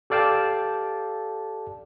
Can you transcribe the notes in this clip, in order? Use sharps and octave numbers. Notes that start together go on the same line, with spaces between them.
G4 A4 D5 F5 G5 A5